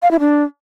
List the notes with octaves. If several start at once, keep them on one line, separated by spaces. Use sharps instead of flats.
F5
E4
D4